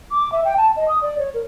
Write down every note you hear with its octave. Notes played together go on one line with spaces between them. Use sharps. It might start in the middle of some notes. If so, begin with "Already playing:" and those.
D6
E5
G5
A5
D#5
D#6
D5
C#5
A#4